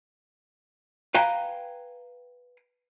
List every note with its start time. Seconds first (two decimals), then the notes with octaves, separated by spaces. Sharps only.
1.15 B4 F5 G5 G#5 A#5